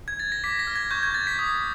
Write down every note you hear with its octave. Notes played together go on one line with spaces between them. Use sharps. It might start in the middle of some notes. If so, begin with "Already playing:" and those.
G#6
A6
A#6
D6 B6
A#6
F6
G#6
C#6 G6
G#6
G6 A6
B6
D#6